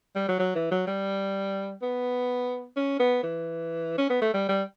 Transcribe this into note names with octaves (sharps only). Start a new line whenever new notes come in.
G3
F#3
F#3
E3
F#3
G3
B3
C#4
B3
E3
C#4
B3
A3
G3
G3